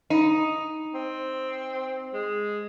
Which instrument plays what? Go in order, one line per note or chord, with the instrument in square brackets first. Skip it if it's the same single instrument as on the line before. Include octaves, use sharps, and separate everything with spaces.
[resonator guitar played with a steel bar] D#4
[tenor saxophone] C4
G#3